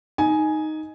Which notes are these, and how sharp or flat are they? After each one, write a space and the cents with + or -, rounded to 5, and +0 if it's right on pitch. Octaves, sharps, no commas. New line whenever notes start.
D#4 +0 G#5 +10